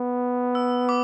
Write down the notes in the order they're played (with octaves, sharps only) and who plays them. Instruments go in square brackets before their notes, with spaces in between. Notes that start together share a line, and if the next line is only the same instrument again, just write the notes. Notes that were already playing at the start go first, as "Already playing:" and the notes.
Already playing: [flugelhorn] B3
[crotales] E6
D6